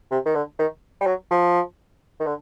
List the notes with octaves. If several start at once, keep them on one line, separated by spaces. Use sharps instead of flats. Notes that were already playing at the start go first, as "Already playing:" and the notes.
C3
D#3
D3
D#3
G3
F#3
F3
D#3
D3